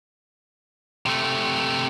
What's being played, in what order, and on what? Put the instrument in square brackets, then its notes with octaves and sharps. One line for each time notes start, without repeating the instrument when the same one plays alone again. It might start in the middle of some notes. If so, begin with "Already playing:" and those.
[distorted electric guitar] C3 A3